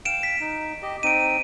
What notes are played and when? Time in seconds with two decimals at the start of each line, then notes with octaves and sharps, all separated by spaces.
0.05 F5 G5 D7 E7
0.23 B6
0.41 D#4
0.82 G4 D#5
1.03 C4 D#4 D7 D#7